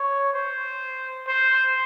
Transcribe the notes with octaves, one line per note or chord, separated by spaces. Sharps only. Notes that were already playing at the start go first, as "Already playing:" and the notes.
Already playing: C#5
C5
C5